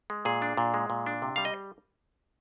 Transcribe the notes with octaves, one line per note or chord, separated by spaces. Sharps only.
G#3
A#2 G#4
D4
A#2
G#3
A#2
D4
C3
G3 F5
D#5